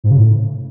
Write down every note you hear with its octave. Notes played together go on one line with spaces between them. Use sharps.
G#2
C#3
A2